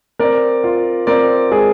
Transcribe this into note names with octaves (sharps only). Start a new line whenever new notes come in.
C4 A#4 D5
F4
C4 A#4 D5
G#3 G#4